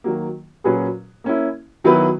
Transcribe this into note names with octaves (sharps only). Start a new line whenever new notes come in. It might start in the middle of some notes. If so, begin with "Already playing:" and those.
D#3 F#3 A#3
A#2 F#3 C#4 G#4 B4
A#3 C#4 E4
D#3 F#3 B3 E4 B4